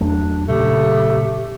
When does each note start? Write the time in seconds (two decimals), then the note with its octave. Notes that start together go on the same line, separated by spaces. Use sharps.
0.01 E2 F#3 A3 D4
0.48 A#2 C#3 F#3 A3 G4